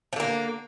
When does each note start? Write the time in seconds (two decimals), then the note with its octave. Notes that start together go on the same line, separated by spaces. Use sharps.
0.13 F3
0.16 D3
0.20 A#3